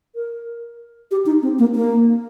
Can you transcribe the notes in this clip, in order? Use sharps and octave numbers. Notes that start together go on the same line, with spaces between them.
A#4
G4
D#4
C4
A#3
A#3